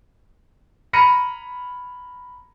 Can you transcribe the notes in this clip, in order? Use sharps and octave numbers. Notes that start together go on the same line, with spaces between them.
A#5 B5 F6 A#6 C#7 D#7